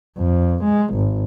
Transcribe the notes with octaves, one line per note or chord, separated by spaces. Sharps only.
F2
G#3
G#1